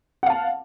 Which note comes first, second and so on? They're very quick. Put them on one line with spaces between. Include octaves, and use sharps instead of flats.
F#5 F5 A5